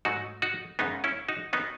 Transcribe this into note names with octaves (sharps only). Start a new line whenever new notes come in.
G#2 F#3 A3 D#4 F#4
D#4 F#4
F#2 C#3 G#3 B3 D#4
C#4 E4
D#4 F#4
D#3 F#3 B3 D#4